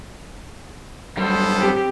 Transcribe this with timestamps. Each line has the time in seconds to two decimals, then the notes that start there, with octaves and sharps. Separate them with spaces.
1.17 F#2 G3 B3 A4 C5
1.58 C4 G4